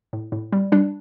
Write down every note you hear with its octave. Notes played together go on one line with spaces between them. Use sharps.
A2
A2
G3
G3 D4